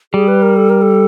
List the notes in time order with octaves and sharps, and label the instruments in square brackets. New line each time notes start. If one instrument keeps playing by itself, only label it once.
[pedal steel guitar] G3 [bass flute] G#4
[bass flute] B4
A#4
A4
A#4
A4